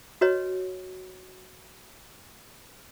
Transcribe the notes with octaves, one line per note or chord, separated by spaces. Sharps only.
F#4 B4 C#5 D#5